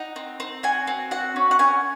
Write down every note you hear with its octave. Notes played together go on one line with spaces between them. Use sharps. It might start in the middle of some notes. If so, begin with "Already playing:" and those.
Already playing: D#4 F#5
C4
C4
F#4 G#5
C4
F#4 F#5
C#4
F#5
C#4 G#5